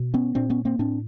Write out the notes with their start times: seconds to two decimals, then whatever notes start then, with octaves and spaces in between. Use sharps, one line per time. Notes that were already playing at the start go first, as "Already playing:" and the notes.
Already playing: B2
0.14 B3 C#4
0.35 A#2 C4 D4
0.50 B3 C#4
0.65 A#3 C4
0.79 A2 C4 D4